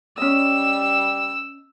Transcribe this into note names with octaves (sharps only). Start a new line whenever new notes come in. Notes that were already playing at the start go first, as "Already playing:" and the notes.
G3 C#4 D#5 E6